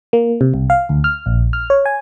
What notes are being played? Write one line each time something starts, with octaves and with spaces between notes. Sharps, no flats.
A#3
C3
C2
F5
D2
F6
A#1
F6
C#5
G#5